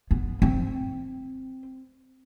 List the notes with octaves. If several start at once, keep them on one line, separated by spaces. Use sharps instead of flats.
B3
C4